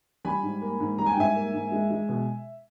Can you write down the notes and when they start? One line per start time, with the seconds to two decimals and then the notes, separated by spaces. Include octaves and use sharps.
0.25 G3 G#5 B5
0.43 G#2
0.62 A#3
0.80 G#2
0.98 G3 A#5
1.06 G#5
1.13 G5
1.17 G#2 E5 G#5
1.35 A#3
1.54 G#2
1.72 G#3
1.90 G#3
2.09 B2